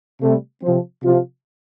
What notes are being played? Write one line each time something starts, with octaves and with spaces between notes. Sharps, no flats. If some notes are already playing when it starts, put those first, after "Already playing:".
C3 G3 A3
C3 F3 C4
C3 F3 F4